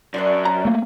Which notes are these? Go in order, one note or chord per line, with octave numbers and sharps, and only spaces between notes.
F#2 D4 C5 C#5
A#5
A3 A#3